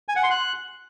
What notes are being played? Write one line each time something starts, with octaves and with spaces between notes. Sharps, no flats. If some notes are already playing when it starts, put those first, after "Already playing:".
G#5
F#5
C6
F#6